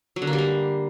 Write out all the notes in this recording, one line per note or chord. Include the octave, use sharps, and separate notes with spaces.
F#3
D3
A#3
G3
A#3